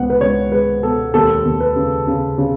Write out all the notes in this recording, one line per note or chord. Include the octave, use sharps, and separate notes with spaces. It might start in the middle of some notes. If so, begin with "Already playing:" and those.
Already playing: C#2 B3 F#5
B4
C#2 C#5
G#3 B4
B2 A4
D#2 A4
D#2
B4
C#3
C#3
C#3